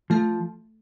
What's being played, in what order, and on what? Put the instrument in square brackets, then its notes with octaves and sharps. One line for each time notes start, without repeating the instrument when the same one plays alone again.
[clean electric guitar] F3 [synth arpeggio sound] A3